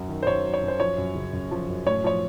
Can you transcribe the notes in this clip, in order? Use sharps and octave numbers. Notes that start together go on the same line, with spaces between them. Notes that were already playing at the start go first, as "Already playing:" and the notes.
Already playing: F#2 F#3
D#3
C5
F#2 C#5
F#3
C#5
F#2
C5
F3 C#5
F#2
C#3
F#2
F3
F#2
A2 C#5
F3 C#5